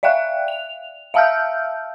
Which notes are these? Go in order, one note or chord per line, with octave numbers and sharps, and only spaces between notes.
D5 E5 F5 G5 F#6
F7
E5 F5 A5 E6 F6 G6